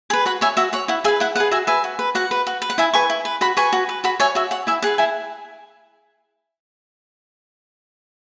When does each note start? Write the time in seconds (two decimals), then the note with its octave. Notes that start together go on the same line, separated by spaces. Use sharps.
0.10 G#4 B4
0.25 F#4 F#5 B5
0.41 C#5 E5 G#5
0.57 F#4 E5
0.73 C#5 F#5
0.88 E4 F#5
1.04 G#4 E5 G#5
1.08 B4
1.20 E4 F#5
1.35 G#4 B4 F#5
1.51 F#4 E5 G#5
1.67 B4 E5 G#5
1.84 F#4
1.99 B4
2.15 F#4 F#5
2.31 B4
2.47 F#4
2.62 B4
2.70 F#5
2.78 E4 E5 G#5
2.94 B4 G#5 C#6
3.10 E4
3.25 B4
3.41 F#4 F#5 B5
3.57 B4 G#5 C#6
3.73 F#4
3.89 B4
4.04 F#4 F#5 B5
4.20 C#5 E5 G#5
4.35 F#4 E5
4.51 C#5 F#5
4.67 E4 E5 G#5
4.82 G#4 B4 F#5
4.98 E4 E5 G#5